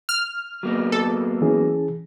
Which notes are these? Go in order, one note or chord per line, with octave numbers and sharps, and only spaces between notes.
F6
F#3 A#3 B3
A4
E3 C#4 G#4